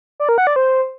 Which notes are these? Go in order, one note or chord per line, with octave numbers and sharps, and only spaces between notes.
D5
A#4
F#5
D5
C5